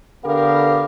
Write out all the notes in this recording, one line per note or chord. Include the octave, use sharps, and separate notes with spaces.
D3 B3 G4 A#4 F5